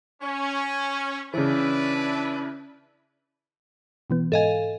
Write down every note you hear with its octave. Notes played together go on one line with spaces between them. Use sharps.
C#4
C#3 E3 D4 E4 B4
B2 E3 B3
G#2 A4 D#5 F5 G#5